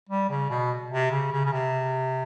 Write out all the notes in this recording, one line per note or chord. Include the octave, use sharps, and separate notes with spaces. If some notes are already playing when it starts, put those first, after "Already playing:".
G3
C#3
B2
C3
C#3
C#3
C#3
C3